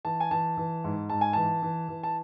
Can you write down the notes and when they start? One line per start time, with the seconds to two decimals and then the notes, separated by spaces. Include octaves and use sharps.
0.05 E3 A5
0.20 G#5
0.31 E3 A5
0.57 E3
0.84 G#2
1.10 G#2 A5
1.21 G#5
1.33 E3 A5
1.63 E3
1.88 E3
2.03 A5